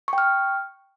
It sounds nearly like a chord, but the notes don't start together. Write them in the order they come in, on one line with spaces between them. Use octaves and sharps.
C#6 G5 F6